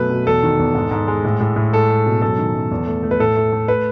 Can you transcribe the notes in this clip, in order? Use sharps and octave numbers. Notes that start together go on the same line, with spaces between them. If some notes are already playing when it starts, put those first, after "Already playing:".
Already playing: F#2 B2 A3 B4
B2
E2 A4
D#3
E2
G#2
G#2
G#3
A2
A2
A2
G#3 A4
G#3
B2
F#2 A4
D#3
F#2
E2
A3
A3
B4
A2 A4
A3
A3
B4